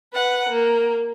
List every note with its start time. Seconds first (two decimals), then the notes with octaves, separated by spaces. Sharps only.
0.13 B4 F#5
0.49 A#3